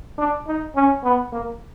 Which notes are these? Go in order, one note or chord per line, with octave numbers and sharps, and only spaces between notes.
D4
D#4
C#4
B3
A#3